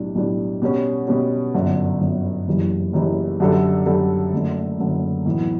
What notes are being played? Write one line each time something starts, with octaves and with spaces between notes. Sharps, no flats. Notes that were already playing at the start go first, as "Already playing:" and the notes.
Already playing: B1 A2 G3 D4
B1 A2 G3 D4
B2 G3 C#4
B2 G3 C#4
G1 F#2 D3
G1 F#2 D3
F#1 F#2 E3 G3
F#1 F#2 E3 G3
F#2 D3 G3 D4 A4
F#2 D3 G3 D4 A4
F#1 F#2 D3 A3
F#1 F#2 D3 A3
B1 A2 E3 B3